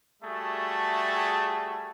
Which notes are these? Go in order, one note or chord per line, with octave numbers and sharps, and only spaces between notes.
G3 A3 F#4 G#4 E5 A5